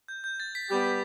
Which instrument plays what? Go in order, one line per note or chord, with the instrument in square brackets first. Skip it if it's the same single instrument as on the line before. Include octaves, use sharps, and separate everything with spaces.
[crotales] G6
G6
A6
B6
[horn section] G3 B3 G4 [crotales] G6